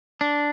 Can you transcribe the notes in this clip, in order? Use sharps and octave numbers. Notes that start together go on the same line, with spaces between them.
D4